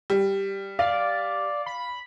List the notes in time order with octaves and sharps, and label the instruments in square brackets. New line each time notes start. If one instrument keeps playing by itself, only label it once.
[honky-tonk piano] G3
[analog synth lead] D5 [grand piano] F5
[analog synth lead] B5